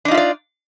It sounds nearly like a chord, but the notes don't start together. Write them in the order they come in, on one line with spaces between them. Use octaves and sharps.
D4 D#4 F4 E5 D5